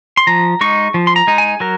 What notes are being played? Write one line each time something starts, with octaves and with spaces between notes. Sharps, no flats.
C6
F3 A#5
G#3 D#4 C#6
F3
C6
A#5
G#3 D#4
G#5
F#3 A#4